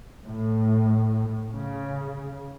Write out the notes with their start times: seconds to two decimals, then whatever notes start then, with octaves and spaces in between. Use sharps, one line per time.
0.24 A2
1.52 C#3